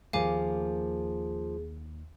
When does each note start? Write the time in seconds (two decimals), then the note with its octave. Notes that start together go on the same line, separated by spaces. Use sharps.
0.13 D#2 F3 A#3 G#4 F5 G#5 D6